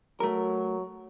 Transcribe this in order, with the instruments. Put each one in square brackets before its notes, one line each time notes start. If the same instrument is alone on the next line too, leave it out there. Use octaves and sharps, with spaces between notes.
[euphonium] F#3 [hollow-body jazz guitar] A3 A#4